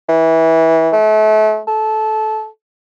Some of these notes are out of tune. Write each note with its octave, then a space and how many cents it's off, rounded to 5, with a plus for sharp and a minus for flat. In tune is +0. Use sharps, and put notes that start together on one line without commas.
E3 -20
A3 -35
A4 -20